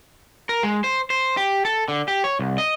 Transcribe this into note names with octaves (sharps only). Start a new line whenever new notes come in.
A#4
G#3
C5
C5
G4
A4
D3
G4
C#5
C2
D#5